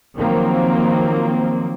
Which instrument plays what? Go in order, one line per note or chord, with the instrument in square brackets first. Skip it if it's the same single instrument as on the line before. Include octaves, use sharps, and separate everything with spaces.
[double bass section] D#3 F3 F#3 A#3 C4